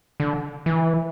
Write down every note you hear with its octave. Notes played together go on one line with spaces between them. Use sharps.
D3
E3